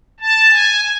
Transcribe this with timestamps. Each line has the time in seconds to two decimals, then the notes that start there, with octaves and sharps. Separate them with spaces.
0.20 A5
0.50 G#5